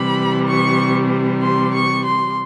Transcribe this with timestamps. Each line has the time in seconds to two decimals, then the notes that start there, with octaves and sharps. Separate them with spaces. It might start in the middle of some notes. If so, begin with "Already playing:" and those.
Already playing: C3 E3 G3 B5
0.47 C#6
1.42 C6
1.73 C#6
2.04 C6